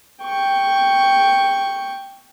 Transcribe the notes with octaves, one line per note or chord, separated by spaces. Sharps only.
G5 C#6